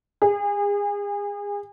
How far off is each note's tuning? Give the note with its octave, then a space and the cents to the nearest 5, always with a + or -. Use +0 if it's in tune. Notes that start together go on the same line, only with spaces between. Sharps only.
G#4 -35